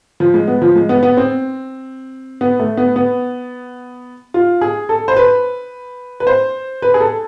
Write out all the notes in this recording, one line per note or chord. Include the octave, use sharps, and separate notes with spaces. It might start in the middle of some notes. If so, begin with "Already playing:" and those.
F3
G#3
B3
F3
G#3
B3
B3
C4
B3
A3
B3
B3
F4
G#4
A4
C5
B4
B4
C5
B4
G#4
A4